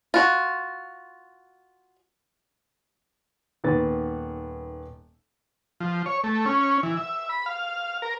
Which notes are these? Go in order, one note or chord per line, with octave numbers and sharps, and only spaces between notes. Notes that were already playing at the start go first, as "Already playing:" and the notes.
F4 F#4
D#1 D#3 B3 B4 A6
F3
C#5
A3
C#4
E3
E5
B5
F5
A#4